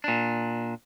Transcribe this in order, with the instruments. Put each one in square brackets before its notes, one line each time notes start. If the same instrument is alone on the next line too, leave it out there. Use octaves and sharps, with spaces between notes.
[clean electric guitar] A#2 D4